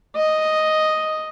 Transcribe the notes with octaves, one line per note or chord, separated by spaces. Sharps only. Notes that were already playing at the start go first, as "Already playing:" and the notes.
D#5